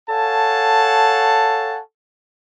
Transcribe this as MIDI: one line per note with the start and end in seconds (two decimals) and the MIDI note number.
0.10 1.80 69
0.10 1.80 73
0.10 1.80 77
0.10 1.80 78
0.10 1.80 80
0.10 1.80 81